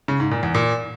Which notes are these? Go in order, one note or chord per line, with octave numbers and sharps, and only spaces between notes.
C#3
G#2
A#2
E2
A#2